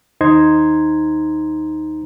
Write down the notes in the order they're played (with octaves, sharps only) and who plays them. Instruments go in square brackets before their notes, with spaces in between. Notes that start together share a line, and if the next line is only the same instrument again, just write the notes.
[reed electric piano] D#2 D#4 C5 A#5 C6 G#6